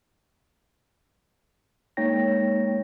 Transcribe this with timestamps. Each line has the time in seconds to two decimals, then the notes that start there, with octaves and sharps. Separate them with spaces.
1.97 G#3 A#3 D#4 C#5 G5 A#6